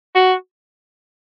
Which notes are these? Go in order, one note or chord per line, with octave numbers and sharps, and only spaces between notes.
F#4